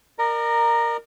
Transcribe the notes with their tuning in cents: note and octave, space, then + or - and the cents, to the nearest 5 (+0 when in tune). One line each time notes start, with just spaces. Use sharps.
A#4 +0 D5 +45 A#5 +0